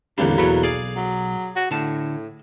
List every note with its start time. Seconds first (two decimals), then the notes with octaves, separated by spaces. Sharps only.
0.18 A1 E2 D3 G3 A#3 C4 D4
0.38 B1 E2 F#3 A4 B5
0.63 G#4 D5 F5
0.96 F#3
1.56 F#4
1.71 A2 D3 A5